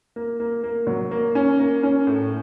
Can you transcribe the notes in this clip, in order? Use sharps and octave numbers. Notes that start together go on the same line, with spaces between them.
A#3
A#3
A#3
F#3
A#3
C#4
A#3
C#4
A2